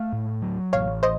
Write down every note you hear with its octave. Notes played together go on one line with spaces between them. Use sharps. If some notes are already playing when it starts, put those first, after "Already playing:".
Already playing: A3 F5
A2
F#3
A1 C#5 F5
C5 D#5